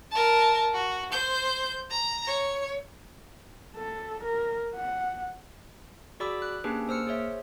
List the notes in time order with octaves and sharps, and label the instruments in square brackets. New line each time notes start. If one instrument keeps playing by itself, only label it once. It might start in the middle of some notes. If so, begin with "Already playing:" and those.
[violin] A#4 A5
F#4
C5 G6
A#5
C#5
[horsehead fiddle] A4
A#4
F#5
[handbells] F#4 G#4 D5 B5 D6 E6
F#6
A#3 C#4 D4 G4 G#4 B4
A#3 C5 E6 F6 C#7
G#4 C5 C#5 E5